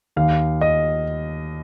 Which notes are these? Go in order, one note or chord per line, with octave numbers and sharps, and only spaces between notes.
D#2 F5
D#5